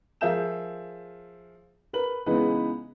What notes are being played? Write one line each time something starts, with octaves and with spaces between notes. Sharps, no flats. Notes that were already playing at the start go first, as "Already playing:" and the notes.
F3 G#4 A#4 E5 G6 E7
A#4 B4 F#7
C#3 E3 G#3 B3 D#4 B4